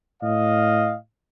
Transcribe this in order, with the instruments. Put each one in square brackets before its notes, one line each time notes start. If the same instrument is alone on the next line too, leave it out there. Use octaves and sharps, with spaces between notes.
[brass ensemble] A2 D#5 F5